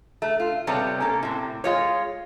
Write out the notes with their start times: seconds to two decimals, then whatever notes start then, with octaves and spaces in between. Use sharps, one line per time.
0.22 A3
0.40 F4
0.67 C3 G3 B3 A4 C#5
1.00 A#3 C#4 A4
1.23 A2 C3
1.64 G#3 F4 C#5